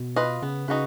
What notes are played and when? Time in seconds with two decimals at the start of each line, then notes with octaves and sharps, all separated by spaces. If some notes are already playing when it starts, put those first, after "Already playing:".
Already playing: B2
0.16 F4 B4 D#5
0.42 C#3 B3
0.68 C#3 D#4 F#4 B4